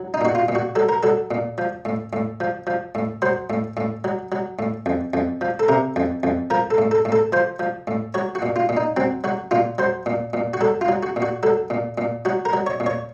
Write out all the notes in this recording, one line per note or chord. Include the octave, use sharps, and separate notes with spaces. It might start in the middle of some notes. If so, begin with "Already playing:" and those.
Already playing: F#3
D#4
A#2 F#4
F4
A#2
F#4
F#3 A4
A#4
F#3 A4
A#2
F3
A2
A2
F3
F3
A2
F#3 C5
A2
A2
F#3
F#3
A2
F2
F2
F3
A4
C3 A#4
F2
F2
F3 A#4
A4
A2
A4
A2
A4
F3 C5
F3
A2
F#3 C#5
F#4
A#2
F4
A#2
D#4
F#3 C4
F#3 F#4
A#2 F4
F#3 C5
A#2
A#2
F#4
F#3 A4
F4
F#3
F#4
A#2
F#4
F#3 A4
A#2
A#2
F#3 F#4
A#4
F#3
C#5
A#2
C#5